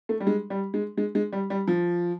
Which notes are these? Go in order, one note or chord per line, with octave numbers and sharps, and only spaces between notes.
A3
G3
G#3
G3
G#3
G#3
G#3
G3
G3
F3